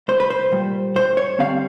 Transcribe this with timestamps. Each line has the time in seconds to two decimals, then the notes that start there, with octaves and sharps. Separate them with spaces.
0.08 C2 C5
0.20 B4
0.30 C5
0.52 A#2 G3
0.95 G2 C5
1.17 C#5
1.38 D3 G3 C4 F5